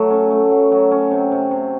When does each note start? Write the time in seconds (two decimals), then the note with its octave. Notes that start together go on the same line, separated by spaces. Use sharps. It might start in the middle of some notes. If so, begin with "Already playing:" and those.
Already playing: F#3 A3
0.10 C#4
0.31 A3
0.51 F#3
0.72 F#3
0.91 C#4
1.11 C3
1.32 C3
1.51 C3